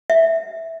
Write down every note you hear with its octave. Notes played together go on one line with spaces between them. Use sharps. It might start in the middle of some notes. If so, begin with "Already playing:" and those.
E5